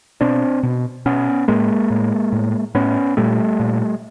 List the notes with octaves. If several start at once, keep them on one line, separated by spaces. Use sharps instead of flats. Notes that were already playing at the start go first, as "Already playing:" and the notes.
B2 C4 D4
B2
B2 B3 C#4
A2 G#3 A#3
A2
A2
A2 B3 C#4
A#2 G3 A3
A#2